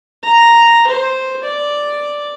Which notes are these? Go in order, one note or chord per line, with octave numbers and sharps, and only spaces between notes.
A#5
C5
D5